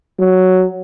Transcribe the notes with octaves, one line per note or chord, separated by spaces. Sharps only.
F#3